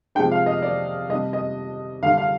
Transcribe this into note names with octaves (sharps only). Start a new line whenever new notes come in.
C3 F3 G#3 D4 G5
F5
D#5
D5
C3 G3 D4 D#5
D#5
D3 G3 D4 F5
F5